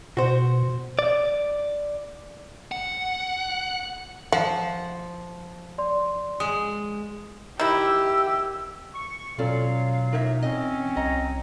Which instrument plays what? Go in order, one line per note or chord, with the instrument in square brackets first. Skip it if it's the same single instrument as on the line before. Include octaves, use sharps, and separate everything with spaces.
[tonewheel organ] B2 [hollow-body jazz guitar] F#4 C5
[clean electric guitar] D5
[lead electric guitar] F#5
[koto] F3 [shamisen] F#5
[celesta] D5 C6
[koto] G#3 [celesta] D#6
[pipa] D#3 E4 [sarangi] G4 [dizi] E6
[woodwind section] C#6
[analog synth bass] B2 [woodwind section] F#3 F4 F5 [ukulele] C#4 A4 D5
[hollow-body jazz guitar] E2 D#4 [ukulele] A#4 C#5 E5
[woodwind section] C4 C#4 [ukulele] D#5
[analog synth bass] C2 [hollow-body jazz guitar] D#5 [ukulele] A#5